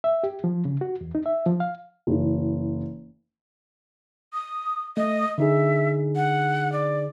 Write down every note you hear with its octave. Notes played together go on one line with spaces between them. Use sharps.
E5
G4
F3
C#3
F#4
E2
D#4
E5
F3
F5
F#1 E3
D#6
A3 D#5
D3 D#4 G#4 E5
F#5
D5